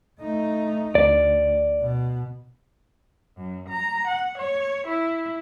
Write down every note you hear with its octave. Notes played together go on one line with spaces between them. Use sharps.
A3 D#4
D2 D5
B2
F#2
A#5
F#5
C#5
E4